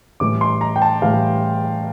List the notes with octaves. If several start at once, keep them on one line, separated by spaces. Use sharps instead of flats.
A2 E3 G3 D6
C6
A#5
G5
A5
A2 E3 G3 F5